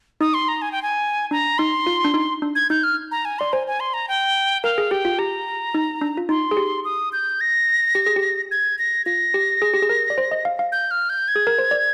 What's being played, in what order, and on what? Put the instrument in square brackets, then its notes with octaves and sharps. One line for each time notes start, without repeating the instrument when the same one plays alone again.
[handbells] D#4 [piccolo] D#6
[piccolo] C6
A#5
G#5
G5
G#5
[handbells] D4 [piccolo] A#5
[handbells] D#4 [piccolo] C6
[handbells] F4
D4
D#4
D4
[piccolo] G#6
[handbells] D#4 [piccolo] G6
[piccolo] F6
A#5
G#5
[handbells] D5 [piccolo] C6
[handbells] C5 [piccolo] G#5
[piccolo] G#5
C6
A#5
G5
[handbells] A#4 [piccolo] F5
[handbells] G#4
[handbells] G4 [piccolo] G5
[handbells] F4
[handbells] G4 [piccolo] A#5
[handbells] D#4
D4
F4
[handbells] D#4 [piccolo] C6
[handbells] G#4
G4
[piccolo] D#6
G6
A#6
[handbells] G4
G#4
G4
[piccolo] G#6
A#6
[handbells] F4 [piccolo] A#6
[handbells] G4
G#4
G4
G#4
A#4
D5
C5
D#5
F5
F5
[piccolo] G6
F6
G6
G#6
[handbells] G#4
A#4
C5
D5